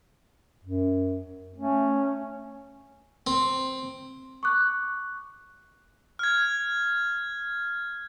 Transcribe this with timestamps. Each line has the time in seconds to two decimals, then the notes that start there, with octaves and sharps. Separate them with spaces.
0.63 F#2
1.56 A3 C#4
3.27 C4
4.43 C#6 D6 F#6
6.19 F6 G#6